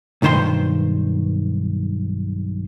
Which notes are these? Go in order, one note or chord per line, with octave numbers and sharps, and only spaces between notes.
B1 G2 D#3 C5 C6